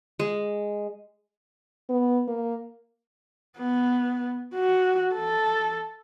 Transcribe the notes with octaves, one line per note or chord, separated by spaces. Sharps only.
G#3
B3
A#3
B3
F#4
A4